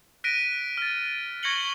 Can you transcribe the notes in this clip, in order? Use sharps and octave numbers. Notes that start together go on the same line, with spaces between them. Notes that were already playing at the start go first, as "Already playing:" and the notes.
F#6 A#6 B6 D7 D#7
F6 A6
C#6 G#6 A#6 C#7 F#7 G7